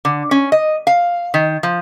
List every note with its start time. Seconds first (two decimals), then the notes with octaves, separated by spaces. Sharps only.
0.05 D3
0.31 C#4
0.52 D#5
0.87 F5
1.34 D#3
1.63 F3